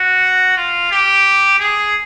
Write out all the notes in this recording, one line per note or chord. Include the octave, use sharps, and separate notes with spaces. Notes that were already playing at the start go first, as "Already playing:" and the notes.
Already playing: F#4
F4
G4
G#4